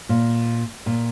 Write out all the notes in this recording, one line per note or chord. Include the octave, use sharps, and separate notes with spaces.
A#2
A#2